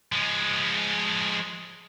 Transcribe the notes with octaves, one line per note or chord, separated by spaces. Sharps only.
F3 G#3